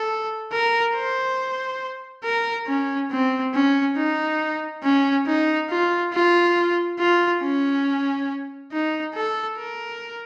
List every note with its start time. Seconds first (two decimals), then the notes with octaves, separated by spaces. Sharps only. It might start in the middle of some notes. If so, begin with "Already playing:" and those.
Already playing: A4
0.52 A#4
0.95 C5
2.24 A#4
2.67 C#4
3.11 C4
3.54 C#4
3.96 D#4
4.83 C#4
5.27 D#4
5.70 F4
6.13 F4
6.99 F4
7.42 C#4
8.72 D#4
9.15 A4
9.58 A#4